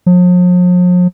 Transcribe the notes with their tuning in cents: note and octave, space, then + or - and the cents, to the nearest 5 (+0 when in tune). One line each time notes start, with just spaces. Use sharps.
F3 +45